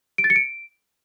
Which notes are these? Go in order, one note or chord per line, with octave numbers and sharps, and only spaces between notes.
D7
A6
C#7
D7